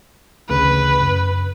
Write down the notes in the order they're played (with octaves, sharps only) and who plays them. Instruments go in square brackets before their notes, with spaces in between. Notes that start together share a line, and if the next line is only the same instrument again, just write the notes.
[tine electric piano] A1 D2 C#3 [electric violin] B4 B5
[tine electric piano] F#2